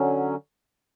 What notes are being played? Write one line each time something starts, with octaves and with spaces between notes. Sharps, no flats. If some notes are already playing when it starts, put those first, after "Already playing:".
Already playing: D3 F#3 C#4